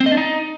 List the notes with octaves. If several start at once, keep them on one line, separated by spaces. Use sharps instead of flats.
C4
D#5
D4
D#4